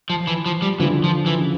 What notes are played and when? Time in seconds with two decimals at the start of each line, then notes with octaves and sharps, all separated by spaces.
0.10 F3
0.27 E3
0.46 F3
0.62 G3
0.79 D3 E3 F3
1.04 F3
1.26 E3
1.39 C#3